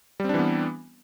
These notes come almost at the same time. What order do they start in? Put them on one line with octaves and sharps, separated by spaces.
G3 C4 D4 E3 B3